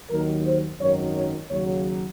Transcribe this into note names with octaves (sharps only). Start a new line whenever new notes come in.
D#2 D#3 F#3 A#4
C5
G#1 F#2 D#3 F#3 C#5
C#5
D#2 C#3 F#3 C#5